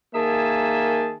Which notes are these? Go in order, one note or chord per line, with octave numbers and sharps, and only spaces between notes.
D#3 A#3 G#4 E5 G#5 A5